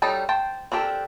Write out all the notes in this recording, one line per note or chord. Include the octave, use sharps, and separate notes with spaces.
F#3 G3 D#4 A4
C5 G5 A5
C4 D4 G4 A4 A#4